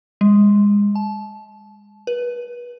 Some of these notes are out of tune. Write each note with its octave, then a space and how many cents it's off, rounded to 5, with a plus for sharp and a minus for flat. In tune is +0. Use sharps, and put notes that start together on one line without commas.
G#3 -25
A5 -25
B4 -30